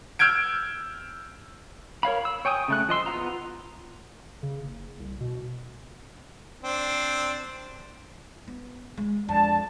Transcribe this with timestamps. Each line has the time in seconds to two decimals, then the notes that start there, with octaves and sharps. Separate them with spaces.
0.19 E6 F6 G6 G#6 D7
2.03 A#4 C#5 F5 B5
2.25 E6
2.45 C#5 G5 G#5 D#6
2.68 C#3 A3 F#6
2.89 F3 D#5 C6 E6
3.06 B3 F4 F5 A#5
4.43 C#3
4.63 F#1
5.00 C2
5.20 B2
6.63 C4 D4
8.48 B3
8.98 G#3
9.29 F2 G#3 D4 A5